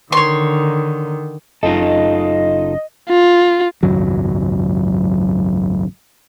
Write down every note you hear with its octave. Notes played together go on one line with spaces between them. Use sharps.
D3 D#3 C#5 C6
F#1 D#4 F4 A4 D#5
F4
G#1 C#2 F#2 F#3